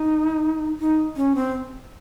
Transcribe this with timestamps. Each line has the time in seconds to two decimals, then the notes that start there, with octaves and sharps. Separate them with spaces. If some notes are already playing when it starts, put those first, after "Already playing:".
Already playing: D#4
0.80 D#4
1.17 C#4
1.35 C4